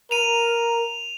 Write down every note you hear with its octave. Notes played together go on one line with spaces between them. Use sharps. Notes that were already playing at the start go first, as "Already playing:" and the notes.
A#4 D#7 F7